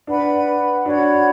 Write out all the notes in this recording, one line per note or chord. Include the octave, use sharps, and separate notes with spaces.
D4 B4 F#5 B5
D4 F#4 C#5 F#5 B5